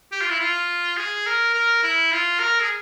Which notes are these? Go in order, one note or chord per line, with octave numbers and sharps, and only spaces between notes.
G4
F4
E4
F4
G#4
A#4
A#4
E4
F4
A#4
G#4